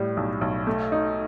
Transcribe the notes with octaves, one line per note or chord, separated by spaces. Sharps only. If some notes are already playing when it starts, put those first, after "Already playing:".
Already playing: A2 G3
B1
B1
A3
D#4